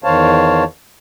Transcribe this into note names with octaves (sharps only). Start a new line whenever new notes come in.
E2 D#3 C5 C#5 F5 A5